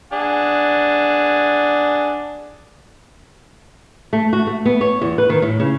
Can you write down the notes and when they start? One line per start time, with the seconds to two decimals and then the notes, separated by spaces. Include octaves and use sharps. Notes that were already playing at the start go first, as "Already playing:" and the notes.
0.13 D4 G#4 F#5
4.13 A3
4.33 F#4
4.47 A3
4.66 B3
4.81 C#5
5.01 E2
5.18 B4
5.30 D#3
5.42 A2
5.60 C#3